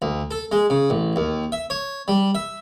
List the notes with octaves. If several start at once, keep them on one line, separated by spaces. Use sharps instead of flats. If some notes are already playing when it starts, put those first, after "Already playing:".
D2
A4
G#3
C#3
A1
D#2
E5
C#5
G3
E5